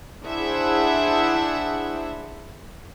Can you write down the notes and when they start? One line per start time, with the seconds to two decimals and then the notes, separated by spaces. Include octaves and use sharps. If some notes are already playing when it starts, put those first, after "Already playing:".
0.25 D4 E4 G#4 C5 E5 F#5